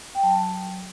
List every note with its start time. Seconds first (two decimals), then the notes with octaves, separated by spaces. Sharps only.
0.15 G5
0.23 F#3 A5